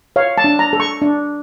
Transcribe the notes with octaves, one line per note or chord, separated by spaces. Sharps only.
C#5 F5
A5
D4
A#5
A4
C#6
D4